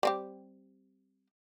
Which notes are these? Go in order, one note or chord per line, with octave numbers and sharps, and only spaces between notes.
G3 C4 G4